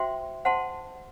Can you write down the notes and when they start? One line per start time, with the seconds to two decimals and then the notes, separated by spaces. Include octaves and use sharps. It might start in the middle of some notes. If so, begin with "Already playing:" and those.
Already playing: F#4 C5 E5 G5 C6
0.45 C5 F#5 A5 C6